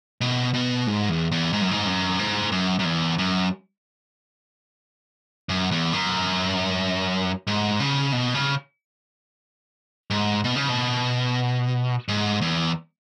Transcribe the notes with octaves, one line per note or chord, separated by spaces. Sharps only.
B2
B2
G#2
E2
E2
G#2
F#2
G#2
F#2
G#2
F#2
F#2
E2
F#2
F#2
E2
F#2
G#2
C#3
B2
C#3
G#2
B2
C#3
B2
G#2
E2